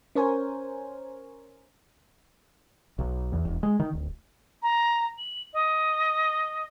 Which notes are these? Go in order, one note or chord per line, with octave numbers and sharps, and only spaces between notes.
C#4 A#4 C5 C#5 G#5
B1
E2
E1
G#3
D#3
D1
A#5
F#7
D#5